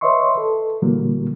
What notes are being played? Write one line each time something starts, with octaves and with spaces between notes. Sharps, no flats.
B4 C#5 D#5 E5 C6 C#6
A4
A#2 D3 E3 F#3 G3 A#3